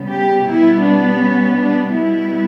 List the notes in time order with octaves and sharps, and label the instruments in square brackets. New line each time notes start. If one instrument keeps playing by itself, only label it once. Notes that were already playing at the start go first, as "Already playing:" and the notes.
Already playing: [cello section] C#3 G3 B3
G4
B2 G3 B3 E4
D4
C#4
D4
B2 G3 B3 E4